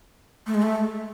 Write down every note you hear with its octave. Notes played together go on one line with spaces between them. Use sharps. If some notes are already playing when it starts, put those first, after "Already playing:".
A3
G#3
A3